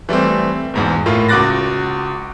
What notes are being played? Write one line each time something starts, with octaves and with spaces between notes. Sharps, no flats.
E3 G3 A3 C4
E2 G#2 B2
A2 A#3 F4
C#2 F#4 D6 F#6 A6 A#6